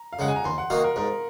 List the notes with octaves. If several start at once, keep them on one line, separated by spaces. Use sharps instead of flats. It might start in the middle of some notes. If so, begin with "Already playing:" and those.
Already playing: A#5
F5
C#3 G#3 F#5
G#5
A#5
D#2 C6
F#5
D#3 A#3 D#4 F#4 F5
A#4
G#2 A#4